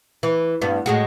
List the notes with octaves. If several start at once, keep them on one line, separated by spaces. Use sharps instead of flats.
E3
G2 B3
A2 G#3 F#4